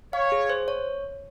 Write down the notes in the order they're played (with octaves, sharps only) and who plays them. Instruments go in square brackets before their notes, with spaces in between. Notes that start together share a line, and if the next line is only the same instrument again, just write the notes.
[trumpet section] C#5 [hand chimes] F5
[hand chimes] G#4
C5
C#5